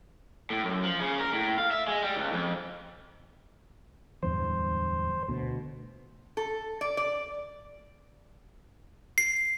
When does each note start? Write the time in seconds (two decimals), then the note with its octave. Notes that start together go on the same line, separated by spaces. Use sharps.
0.50 A2
0.63 F#2
0.84 F3
1.00 C#3
1.19 A#4
1.33 A2
1.58 F5
1.71 E5
1.88 G#3
2.02 G3
2.16 C#2
2.32 F2
4.23 D1 E2 G2 C5
5.28 D2 B2
6.37 A4
6.81 D5
6.97 D5
9.18 C7